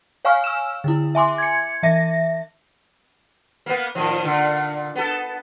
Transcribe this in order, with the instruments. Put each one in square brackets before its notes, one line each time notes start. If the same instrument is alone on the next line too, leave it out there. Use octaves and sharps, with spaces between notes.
[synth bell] C#5 F5 G#5 C#6 F6
E6 E7
D3 E4
E5 G#5 C6 D6
G#6 C#7
E3 E5 A#6
[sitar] A#3 B3
A2 D#3 F3
A#2 D3
B3 A4